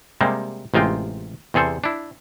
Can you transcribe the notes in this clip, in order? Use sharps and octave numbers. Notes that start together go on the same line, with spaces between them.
C3 G3 G#3 A#3
A1 C3 G#3 F4 G5
E2 C3 G#4 A4 C5
D4 E4